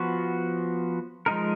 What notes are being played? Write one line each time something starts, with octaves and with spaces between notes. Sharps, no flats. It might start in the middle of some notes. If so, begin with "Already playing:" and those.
Already playing: F3 B3 F#4
F3 G#3 D#4 A#4